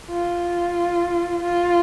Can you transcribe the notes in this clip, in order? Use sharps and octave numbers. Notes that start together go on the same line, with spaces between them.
F4
F4